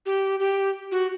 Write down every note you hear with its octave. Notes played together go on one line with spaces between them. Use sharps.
G4
G4
F#4